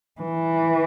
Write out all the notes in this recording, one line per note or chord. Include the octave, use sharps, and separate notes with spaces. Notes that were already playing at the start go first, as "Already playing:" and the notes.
E3